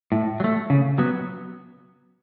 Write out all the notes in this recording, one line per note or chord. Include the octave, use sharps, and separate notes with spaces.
A2
F#3
A3
C#3
F#3 B3